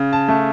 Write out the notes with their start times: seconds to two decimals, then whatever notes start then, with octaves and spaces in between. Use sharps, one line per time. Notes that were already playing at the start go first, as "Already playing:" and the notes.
Already playing: C#3
0.13 A5
0.28 A3